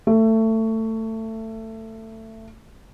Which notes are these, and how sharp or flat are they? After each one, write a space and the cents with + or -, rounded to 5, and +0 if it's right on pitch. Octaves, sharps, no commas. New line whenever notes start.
A3 +20